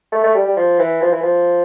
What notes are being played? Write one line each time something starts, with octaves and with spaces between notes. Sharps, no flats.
A3
A3
G3
G3
F3
E3
F3
E3
F3